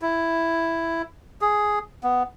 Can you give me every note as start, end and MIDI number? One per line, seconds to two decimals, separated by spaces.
0.02 1.02 64
1.41 1.79 68
2.04 2.23 59